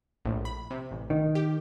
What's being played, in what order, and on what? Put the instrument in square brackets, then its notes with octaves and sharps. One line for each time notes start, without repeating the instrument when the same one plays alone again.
[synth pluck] A#1 A2
B5
C3
A1
[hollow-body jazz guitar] D#3
[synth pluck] G4